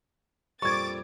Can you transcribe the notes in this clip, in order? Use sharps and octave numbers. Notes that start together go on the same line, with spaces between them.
A#1 F2 G3 C#6 D6 G#6 A6